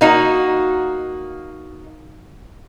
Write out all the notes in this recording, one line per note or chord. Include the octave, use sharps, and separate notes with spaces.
A#3 D#4 F#4